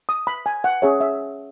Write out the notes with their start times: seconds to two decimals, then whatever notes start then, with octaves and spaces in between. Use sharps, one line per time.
0.09 D#6
0.27 B5
0.46 G#5
0.64 F#5
0.82 C#4 G#4 C#5 E5
1.01 E5